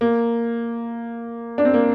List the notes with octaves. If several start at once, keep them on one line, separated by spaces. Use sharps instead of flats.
A#3
D4
C4
A#3